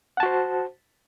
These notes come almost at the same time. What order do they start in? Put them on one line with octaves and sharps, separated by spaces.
F#5 A5 F#4 C5